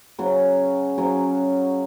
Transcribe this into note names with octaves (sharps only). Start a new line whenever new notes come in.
C#3 F#3 C#4
C#3 F#3 C#4